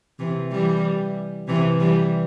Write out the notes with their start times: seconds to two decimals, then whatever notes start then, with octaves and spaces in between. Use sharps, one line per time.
0.19 C3 E3
0.51 E3 G3
1.48 C3 E3
1.80 E3 G3